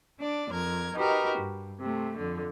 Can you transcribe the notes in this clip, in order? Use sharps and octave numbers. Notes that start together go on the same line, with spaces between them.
D4 D5
F2 A#4 G#6
D#4 F#4 G4 A#4 B4
G2
C3 A3
F2 D3